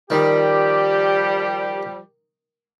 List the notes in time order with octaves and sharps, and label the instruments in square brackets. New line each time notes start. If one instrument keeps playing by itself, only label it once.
[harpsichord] D#3 [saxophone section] F3 G3 [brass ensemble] G4